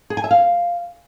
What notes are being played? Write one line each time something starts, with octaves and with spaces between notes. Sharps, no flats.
G#4
G#5
E5
F5